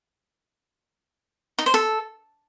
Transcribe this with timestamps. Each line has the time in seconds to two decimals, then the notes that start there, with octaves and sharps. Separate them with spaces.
1.58 D#4
1.66 C5
1.74 A4